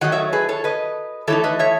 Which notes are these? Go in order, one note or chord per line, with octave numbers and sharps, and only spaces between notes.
D#3 F#3 A3 D#5 F#5
C#5 E5
G#4 B4
A4 C#5
B4 D#5
E3 A3 D#4 A4 C#5
B4 D#5
C#5 E5